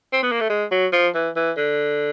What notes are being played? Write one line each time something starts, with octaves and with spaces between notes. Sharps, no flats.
C4
B3
A#3
A3
G#3
F#3
F3
E3
E3
D3